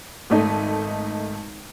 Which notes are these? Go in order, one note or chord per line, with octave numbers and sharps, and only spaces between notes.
G#1 A3 D#4